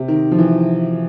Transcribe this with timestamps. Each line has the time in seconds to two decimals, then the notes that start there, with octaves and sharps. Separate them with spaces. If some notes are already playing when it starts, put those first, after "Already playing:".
Already playing: C3
0.08 D#3
0.32 F3
0.39 E3